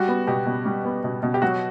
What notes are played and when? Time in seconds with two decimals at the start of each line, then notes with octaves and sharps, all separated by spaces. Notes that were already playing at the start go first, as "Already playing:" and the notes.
Already playing: G3 F#4
0.08 B3
0.27 B2 G4
0.46 B2
0.66 G3
0.85 B3
1.04 B2
1.23 B2
1.34 G4
1.42 F#3 F#4